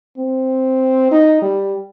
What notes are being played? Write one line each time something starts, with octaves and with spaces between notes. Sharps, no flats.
C4
D#4
G3